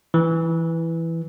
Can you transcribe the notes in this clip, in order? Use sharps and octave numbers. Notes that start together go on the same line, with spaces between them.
E3